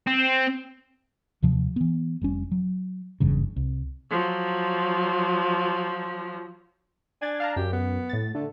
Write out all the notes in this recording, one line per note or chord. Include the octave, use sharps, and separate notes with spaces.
C4
D#2 C3 F3
E3 B3
F1 G3 C#4
F#3
F#1 E2 G2 C#3
C2
F3 F#3
D4 G#5 G#6 A6
F5 A5 A#5
F#2 G4
B3
A2 A6
D3 A3